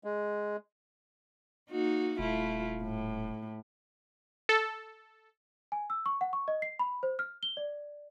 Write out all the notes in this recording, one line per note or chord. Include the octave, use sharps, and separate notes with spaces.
G#3
A#3 D#4 F#4
D#1 A3 E4 F4
A2
A4
G#5
E6
C#6
F#5
C#6
D#5
C7
B5
C5
F6
G7
D5